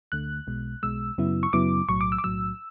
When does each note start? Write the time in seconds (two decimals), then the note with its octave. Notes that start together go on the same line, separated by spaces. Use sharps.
0.12 D2 D3 A3 F#6
0.47 B1 B2 G#3
0.83 B1 B2 G#3 E6
1.18 F#2 C#3 F#3 B3 E4
1.43 C#6
1.53 F#2 C#3 F#3 B3 E4 D6
1.89 B1 A2 F#3 C#6
2.01 D6
2.12 E6
2.18 D6
2.24 B1 A2 F#3 E6